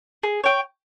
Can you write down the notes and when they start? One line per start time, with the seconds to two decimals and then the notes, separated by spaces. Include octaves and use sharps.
0.23 G#4
0.44 C#5 G5